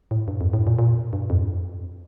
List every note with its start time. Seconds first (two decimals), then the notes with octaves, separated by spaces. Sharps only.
0.11 A2
0.28 G2
0.41 F2
0.53 A2
0.67 A#2
0.79 A#2
1.13 G2
1.30 F2